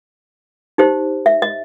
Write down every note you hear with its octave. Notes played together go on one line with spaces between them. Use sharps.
D#4 G4 C5
E5
D#5